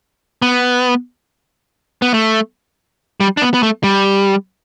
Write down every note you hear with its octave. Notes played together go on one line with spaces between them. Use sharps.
B3
B3
A3
G3
D4
B3
B3
A3
G3